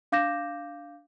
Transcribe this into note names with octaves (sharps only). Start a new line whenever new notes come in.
D4 F5 D6 G6 A#6 E7